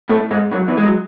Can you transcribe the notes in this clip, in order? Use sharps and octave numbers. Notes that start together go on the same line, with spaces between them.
A2 A3
G#2 G#3
F#2 F#3
E2 E3
G#3
F#3